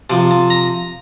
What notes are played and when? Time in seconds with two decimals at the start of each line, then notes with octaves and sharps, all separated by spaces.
0.10 C3 F3 A5
0.31 A5
0.50 A#5